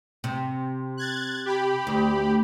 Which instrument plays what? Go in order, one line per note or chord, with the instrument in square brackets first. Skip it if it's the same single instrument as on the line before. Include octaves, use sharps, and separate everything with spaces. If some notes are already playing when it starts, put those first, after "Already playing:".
[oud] C3
[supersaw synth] F#6 G#6 A6
G4 B5
[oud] D2